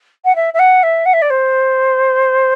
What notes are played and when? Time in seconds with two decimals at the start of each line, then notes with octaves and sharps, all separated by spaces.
0.25 F#5
0.36 E5
0.54 E5
0.59 F#5
0.83 E5
1.06 F#5
1.13 E5
1.22 D5
1.30 C5